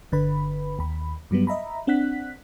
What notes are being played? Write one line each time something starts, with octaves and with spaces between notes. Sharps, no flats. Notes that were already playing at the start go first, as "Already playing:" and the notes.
G1 D3 B4 B5
D#2 B5
G2 F#3 G3 B3
D#5 E5 A#5 B5
C4 D4 F#5 F#6 B6